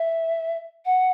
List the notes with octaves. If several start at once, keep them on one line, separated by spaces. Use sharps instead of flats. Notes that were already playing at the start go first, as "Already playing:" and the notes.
Already playing: E5
F#5